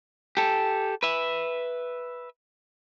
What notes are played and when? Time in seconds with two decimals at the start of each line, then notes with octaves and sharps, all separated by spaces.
0.37 G4 A4
1.03 B4 E5